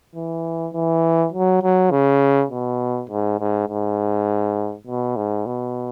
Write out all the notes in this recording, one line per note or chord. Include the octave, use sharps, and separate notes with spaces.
E3
E3
F#3
F#3
C#3
B2
G#2
G#2
G#2
B2
G#2
B2